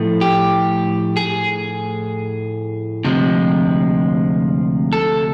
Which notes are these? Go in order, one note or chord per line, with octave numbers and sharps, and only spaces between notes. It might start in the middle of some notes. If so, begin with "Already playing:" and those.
Already playing: A2 F3 A3
G4
G#4
D2 C3 F3 G#3
A4